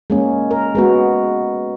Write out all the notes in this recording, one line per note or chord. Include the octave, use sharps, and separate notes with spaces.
G#3 A#3 C#4
A#4
G#3 B3 F#4